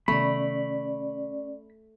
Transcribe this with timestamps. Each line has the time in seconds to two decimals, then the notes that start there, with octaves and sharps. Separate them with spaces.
0.08 C3 D#3 A3 B3 C#4 D5 B5